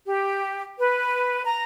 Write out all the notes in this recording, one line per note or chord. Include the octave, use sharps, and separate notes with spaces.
G4
B4
A#5